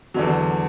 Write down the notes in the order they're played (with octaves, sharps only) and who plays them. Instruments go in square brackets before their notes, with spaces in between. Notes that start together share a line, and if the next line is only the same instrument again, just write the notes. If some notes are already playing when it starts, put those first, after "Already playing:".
[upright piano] E2 D3 F#3